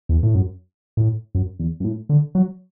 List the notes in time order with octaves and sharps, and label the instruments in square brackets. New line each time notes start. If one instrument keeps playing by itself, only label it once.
[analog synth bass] E2
A2
F#2
A2
F#2
E2
F#2
A2
D3
F#3